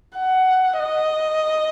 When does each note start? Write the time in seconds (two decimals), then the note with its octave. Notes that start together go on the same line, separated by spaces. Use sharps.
0.18 F#5
0.79 D#5